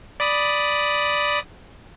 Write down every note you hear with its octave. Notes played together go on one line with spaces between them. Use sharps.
D5 B5 D#6